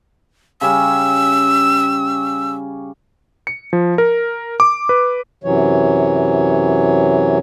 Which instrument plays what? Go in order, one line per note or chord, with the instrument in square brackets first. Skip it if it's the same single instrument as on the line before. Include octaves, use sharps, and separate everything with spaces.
[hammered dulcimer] C#3 G3 C#4 [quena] E6
[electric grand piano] C#7
F3
A#4
D6
B4
[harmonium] F#2 C3 E3 F#3 C#5